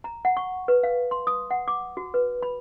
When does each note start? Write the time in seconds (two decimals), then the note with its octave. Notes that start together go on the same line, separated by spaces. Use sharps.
0.04 A#5
0.25 F#5
0.37 C#6
0.68 B4
0.83 F5
1.11 C6
1.27 D#6
1.51 F#5
1.68 D6
1.97 F#4
2.14 B4
2.42 B5